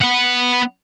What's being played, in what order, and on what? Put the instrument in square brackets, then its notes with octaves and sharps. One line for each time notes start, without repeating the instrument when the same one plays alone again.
[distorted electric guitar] B3 F#5